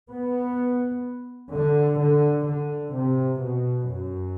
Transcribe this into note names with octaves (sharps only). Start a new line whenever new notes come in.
B3
D3
D3
D3
C3
B2
F#2